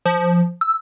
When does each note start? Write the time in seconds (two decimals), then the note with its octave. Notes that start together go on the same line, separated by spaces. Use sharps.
0.06 F3
0.61 E6